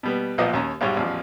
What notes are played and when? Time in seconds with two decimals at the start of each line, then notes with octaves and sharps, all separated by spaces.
0.03 B2 G3 B3
0.38 B1 A#2 F3 B4 D5 D#5
0.53 D#2 C#4 A#5
0.81 B1 G#2 G3 C#5
0.97 A1 E2 F3